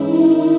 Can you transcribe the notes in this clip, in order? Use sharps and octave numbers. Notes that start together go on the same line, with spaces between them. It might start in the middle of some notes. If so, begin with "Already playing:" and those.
Already playing: G#2 E3 G#3 C#4 D#4 E4
D#3